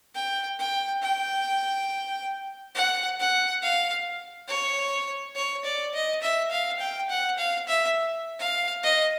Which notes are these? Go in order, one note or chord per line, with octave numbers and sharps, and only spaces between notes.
G5
G5
G5
F#5
F#5
F5
C#5
C#5
D5
D#5
E5
F5
G5
F#5
F5
E5
F5
D#5